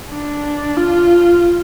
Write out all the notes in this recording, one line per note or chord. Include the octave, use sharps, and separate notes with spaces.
D4
F4